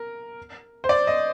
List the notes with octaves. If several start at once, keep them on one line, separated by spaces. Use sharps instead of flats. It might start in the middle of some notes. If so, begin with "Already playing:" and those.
Already playing: A#4
C5
D5
D#5